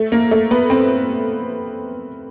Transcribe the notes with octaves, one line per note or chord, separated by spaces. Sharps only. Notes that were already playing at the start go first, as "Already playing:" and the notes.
Already playing: A3
A#3
A3
B3
C4